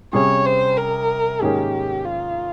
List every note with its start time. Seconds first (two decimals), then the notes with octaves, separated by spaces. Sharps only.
0.13 C3 G3 C#4 G#4 C#5
0.46 C5
0.77 A#4
1.41 G#2 D#3 A#3 C#4 G4 G#4
2.05 F4